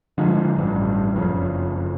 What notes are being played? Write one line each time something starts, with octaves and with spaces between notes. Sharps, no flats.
D3 F3 G#3
A1 G2
F#1 F2 C#3